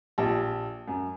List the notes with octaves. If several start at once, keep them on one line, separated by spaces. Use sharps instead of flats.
A#1 G4 A5
F#2